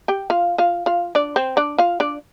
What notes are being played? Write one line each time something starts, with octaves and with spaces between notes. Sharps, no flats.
G4 G5
F4 F5
F4 F5
F4 F5
D4 D5
C4 C5
D4 D5
F4 F5
D4 D5